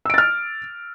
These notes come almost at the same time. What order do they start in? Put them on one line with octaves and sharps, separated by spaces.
E6 D7 A6 F6